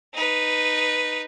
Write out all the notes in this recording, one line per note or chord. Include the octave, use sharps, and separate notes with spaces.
D#4 B4